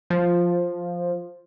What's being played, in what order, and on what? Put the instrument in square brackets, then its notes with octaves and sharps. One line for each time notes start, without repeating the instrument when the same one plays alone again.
[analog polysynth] F3